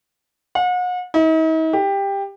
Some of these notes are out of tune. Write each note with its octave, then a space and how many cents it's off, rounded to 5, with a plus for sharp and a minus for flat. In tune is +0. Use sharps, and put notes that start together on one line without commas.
F#5 -40
D#4 +45
G4 +15